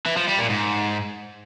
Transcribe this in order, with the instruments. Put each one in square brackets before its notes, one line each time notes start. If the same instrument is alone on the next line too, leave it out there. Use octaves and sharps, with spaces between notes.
[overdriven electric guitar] E3
F3
G3
A#2
G#2